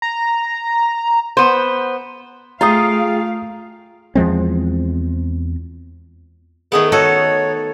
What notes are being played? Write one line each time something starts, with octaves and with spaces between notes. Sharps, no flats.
A#5
B3 C5
A3 F4 G#4 F5 G5 A#5 D#6
E2 F3 G#3 C4
D#3 A3 B3 G#4
F#4 A4 C#5 D#5